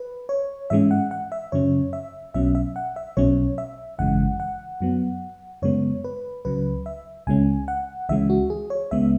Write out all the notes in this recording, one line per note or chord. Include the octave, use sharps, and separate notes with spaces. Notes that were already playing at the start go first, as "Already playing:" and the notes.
Already playing: B4
C#5
G#2 E3 G#3 C#4 E5
F#5
F#5
E5
F#2 C#3 F#3 C#4 C#5
E5
B1 B2 F#3 C#4 E5
E5
F#5
E5
B1 B2 F#3 C#4 C#5
E5
G#1 F#2 C#3 E3 G#3 F#5
F#5
F#2 F#3 B3
F#2 C#3 G#3 B3 C#5
B4
C#2 C#3 F#3 B4
E5
C#2 C#3 G#3 C#4 G#5
F#5
C#2 C#3 E3 G#3 C#4 E5
F#4
G#4
C#5
C#2 C#3 G#3 B3 E5